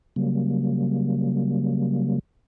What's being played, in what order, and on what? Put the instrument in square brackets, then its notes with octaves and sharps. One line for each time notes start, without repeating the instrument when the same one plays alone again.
[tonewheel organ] C#3 F#3 G3 A#3